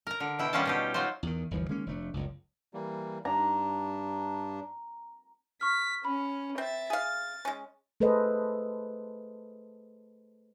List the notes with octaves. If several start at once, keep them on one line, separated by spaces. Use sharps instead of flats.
A#4 A#5
D3 A#5
B2 E4 G5
D3 G3 A#3 C#4 F4 A5
B2 D#4 G4
F#3 D#4 F4 C5
E2 D#3
G1 D#2 E3 F3
D#3 G#3 A#3 C#4
F1 A3 D4
F#1 C#2
E3 G3 A#3
G2 D4 A#5
C#6 F6 B6
C#4 B5
C4 E5 A6
G#4 F5 A6
G#3 C#4
A3 G#4 A4 B4 C5 D#5